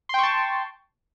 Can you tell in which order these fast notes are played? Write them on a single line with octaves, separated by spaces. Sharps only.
C6 G5 C#6 A5